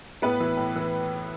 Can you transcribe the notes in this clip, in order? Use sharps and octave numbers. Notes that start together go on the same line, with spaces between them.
A2 B3 B4
E3
A2
E3